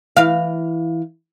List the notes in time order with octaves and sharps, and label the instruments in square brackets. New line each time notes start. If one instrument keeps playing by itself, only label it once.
[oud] E3 F5